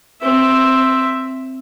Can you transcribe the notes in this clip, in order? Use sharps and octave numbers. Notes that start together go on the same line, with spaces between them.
C4 E5